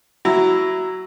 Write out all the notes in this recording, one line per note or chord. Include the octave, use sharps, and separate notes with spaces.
F#3 E4